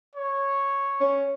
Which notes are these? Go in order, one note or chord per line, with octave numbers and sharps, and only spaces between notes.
C#5
C#4